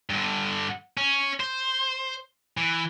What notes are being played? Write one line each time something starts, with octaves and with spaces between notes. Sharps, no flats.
G2 D3
C#4
C5
E3